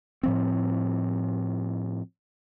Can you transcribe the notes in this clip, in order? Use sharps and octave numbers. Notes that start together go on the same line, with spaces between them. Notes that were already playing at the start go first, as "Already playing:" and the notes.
A2 F3 C4